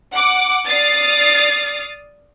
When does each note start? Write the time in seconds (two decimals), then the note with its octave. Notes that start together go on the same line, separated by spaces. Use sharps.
0.13 F#5 D6
0.68 D5 D#6 F6 A6 C7